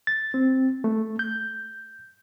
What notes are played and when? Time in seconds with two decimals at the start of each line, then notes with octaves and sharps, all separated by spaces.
0.07 A6
0.34 C4
0.84 A3
1.19 G6